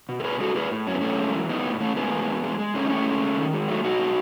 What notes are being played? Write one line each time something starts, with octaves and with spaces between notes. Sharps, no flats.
B2
A4
B2 G#4 B4
G#3 F#4 A4
A2 G#4 B4
A2
F#2 C#4
B3
F#2 A3 C#4
G#3
E3
G#3 B3 D#4
A2
A2 A3 C#4
A2 G#3 B3
E2
E2
G#3
G#3
A2 A3 C#4
D#4
A2 A3 C#4
G#3
G#3
D#3
G#3
F#3 A3
B2 D#4 F#4
G#3